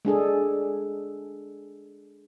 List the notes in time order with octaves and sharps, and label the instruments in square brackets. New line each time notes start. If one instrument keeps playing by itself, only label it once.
[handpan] G#3 D4 G#4 A4